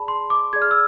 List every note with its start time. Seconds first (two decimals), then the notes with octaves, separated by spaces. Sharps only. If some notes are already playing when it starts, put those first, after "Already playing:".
Already playing: G#4 D5 A5 B5
0.08 C6
0.30 D6
0.53 G#4 D5 G#6
0.62 F6
0.71 E6